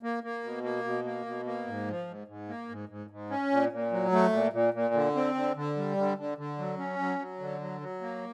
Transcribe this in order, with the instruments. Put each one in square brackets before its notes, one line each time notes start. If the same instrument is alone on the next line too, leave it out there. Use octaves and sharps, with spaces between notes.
[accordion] A#3
A#3
B2
A#3
B2
A#3
B2
A#3
G#2
F3
G#2
G#2
A#3
G#2
G#2
G#2
C#4
A#2
A#2
F#3
A3
A#2
A#2
A#2
D3
C4
D3
D3
G3
D3
D3
D3
F#3
C#4
F#3
F#3
D3
F#3
F#3
A#3